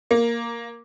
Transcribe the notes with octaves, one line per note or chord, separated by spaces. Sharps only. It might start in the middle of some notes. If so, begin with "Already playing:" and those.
A#3